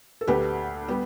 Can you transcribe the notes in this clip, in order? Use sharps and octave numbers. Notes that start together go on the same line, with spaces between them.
A4
D2 D3 A3 G4 B4
G3 B3 G4